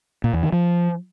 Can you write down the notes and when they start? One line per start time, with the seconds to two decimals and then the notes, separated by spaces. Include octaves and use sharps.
0.24 A#2
0.33 E2
0.43 D#3
0.52 F3